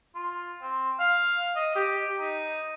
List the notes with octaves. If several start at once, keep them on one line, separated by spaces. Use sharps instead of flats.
F4
C4
F5
D#5
G4
D#4